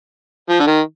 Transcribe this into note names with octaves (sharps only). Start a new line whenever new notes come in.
F3
D3
D#3